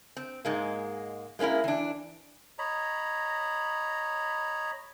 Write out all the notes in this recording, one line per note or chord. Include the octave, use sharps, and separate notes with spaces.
C4
G#2 G#3 A#3
G#3 A#3 C#4 E4 A#4
E3 D4
C#5 D#5 A#5 B5